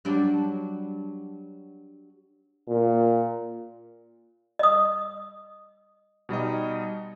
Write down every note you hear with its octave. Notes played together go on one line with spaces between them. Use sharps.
F#3 G3 D4
A#2
D#5 D#6
B2 G3 D#4 D#5